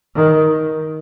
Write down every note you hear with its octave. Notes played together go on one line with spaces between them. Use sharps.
D#3